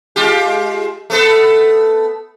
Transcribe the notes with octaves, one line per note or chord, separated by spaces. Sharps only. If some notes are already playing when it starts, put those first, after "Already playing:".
G#3 F4 G4
A3 B3 A4